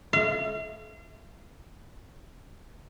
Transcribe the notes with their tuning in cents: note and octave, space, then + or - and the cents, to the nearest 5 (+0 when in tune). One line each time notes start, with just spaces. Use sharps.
F5 -35